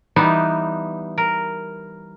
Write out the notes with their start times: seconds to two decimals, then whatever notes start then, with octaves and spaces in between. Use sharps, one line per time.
0.16 E3 G3 B3 D#4
1.18 A#4